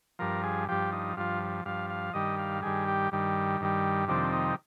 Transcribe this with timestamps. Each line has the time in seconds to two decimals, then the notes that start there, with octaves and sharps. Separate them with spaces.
0.19 G2 F3 A#4
0.43 G#4
0.69 G2 F3 G4
0.93 D#4
1.17 G2 F3 F4
1.65 G2 F3 F5
1.90 F5
2.13 G2 D#3 G3 D#5
2.38 F5
2.62 G2 D#3 G3 G#4
2.88 G4
3.12 G2 D#3 G3
3.60 G2 D#3 G3
4.08 F2 C3 D#3 G3 D4
4.33 D#4